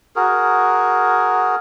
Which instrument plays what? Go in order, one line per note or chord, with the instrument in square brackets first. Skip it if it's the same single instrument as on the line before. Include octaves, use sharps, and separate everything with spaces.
[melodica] F#4 G#4 A#4